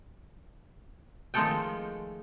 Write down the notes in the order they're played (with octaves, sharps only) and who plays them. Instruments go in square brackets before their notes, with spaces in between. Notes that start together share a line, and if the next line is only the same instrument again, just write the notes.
[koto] D#3 F3 G#3 A3 A4 G5